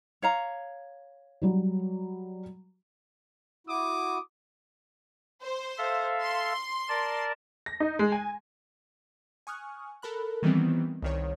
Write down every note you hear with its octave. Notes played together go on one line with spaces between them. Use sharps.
C#5 F5 A#5
F#3 G3
E4 F#4 D6 D#6
C5
A4 E5 F5
C6
A#4 D5 A5
A#6
D#4
G#3
G#5
G#5 C#6 D#6 F6 F#6
A4 A#4 B5 F#6
D#3 E3 G3 B3 C4
C2 D#3 C#5